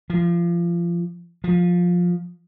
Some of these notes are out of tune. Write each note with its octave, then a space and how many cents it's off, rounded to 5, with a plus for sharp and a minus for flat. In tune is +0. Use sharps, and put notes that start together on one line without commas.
F3 -25
F3 +15